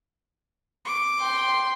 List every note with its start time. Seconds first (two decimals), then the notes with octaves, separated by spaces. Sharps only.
0.85 D6
1.20 G5 C6